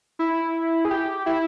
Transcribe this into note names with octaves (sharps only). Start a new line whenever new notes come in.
E4
G#4
G4
E4